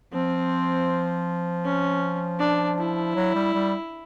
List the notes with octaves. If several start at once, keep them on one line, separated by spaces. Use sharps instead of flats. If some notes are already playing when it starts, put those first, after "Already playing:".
F3 C4
C#4
D4
E4
F#3
G3
G3